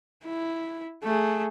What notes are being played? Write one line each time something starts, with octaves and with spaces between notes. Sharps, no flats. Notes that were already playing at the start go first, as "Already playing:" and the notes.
E4
A3 G#4